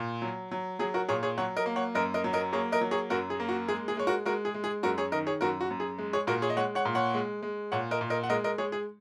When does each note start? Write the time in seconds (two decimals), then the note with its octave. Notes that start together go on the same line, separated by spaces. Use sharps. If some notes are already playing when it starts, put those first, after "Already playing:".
Already playing: A#2
0.22 F#3
0.51 F#3
0.79 F#3 G#4
0.94 F#4 A#4
1.09 A#2 G#4 C#5
1.23 G#4 C#5
1.38 F#3 C#5 F#5
1.57 A#4 D#5
1.66 A#3
1.76 C#5 F#5
1.95 F#2 A#4 D#5
2.14 A#4 D#5
2.24 F#3
2.33 A#4 D#5
2.53 A#3 G#4 C#5
2.72 A#4 D#5
2.81 F#3
2.91 G#4 C#5
3.10 F#2 F#4 A#4
3.30 G#4
3.40 A#3
3.49 F#4
3.68 G#3 G#4
3.88 G#4
3.97 G#3 C#5
4.07 F#4 A#4
4.25 G#3 F#4 A#4
4.45 G#4
4.54 G#3
4.64 G#4
4.83 F#2 F#4 A#4
4.98 G#4 C#5
5.12 D#3 A#4 D#5
5.27 G#4 C#5
5.41 F#2 F#4 A#4
5.61 F#4
5.70 F#2
5.80 G#4
5.98 G#3
6.13 G#4 C#5
6.27 A#2 F#4 A#4
6.42 G#4 C#5
6.50 D#5
6.57 G#3 C#5 F#5
6.75 C#5 F#5
6.85 A#2
6.95 C#5 F#5
7.14 G#3
7.43 G#3
7.72 A#2 C#5 F#5
7.91 A#4 D#5
8.01 A#2
8.10 A#4 D#5
8.24 F#5
8.30 G#3 A#4 D#5
8.44 A#4 D#5
8.58 G#3 G#4 C#5
8.72 G#4